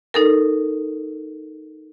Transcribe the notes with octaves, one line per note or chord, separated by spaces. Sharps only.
D#4 A4 A#4